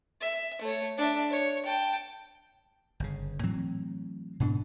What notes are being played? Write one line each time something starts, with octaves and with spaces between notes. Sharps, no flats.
E5
A3 C#5
D4 E5
C#5
G5 A5
G1 C#3
A2 E3 F#3 C4
G#2 B2 D3 D4